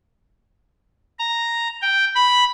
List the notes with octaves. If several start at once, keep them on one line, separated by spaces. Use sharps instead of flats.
A#5
G5
B5